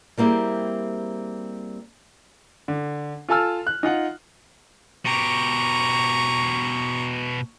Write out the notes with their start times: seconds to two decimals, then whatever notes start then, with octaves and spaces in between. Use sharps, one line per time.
0.17 G3 A#3 C4 E4 G4 G#4
2.68 D3
3.29 F4 A4 G#5 A5 E6 F6
3.67 F#6
3.83 D#4 F4 F#5
5.06 B2 G4 A#5 C#6